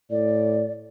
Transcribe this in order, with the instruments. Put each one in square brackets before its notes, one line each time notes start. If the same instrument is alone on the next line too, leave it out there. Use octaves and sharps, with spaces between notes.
[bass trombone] A2 [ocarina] D5